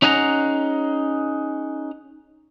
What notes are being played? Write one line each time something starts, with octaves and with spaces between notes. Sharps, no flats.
C#4 D#4 G#4 F#5 G#5 A#5